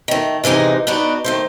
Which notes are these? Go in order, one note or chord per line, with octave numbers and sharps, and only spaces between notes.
D#3 A3
C3 E3 G#3 D#4 G#4
B3 D4 D#4 F#4
D#3 A3 C5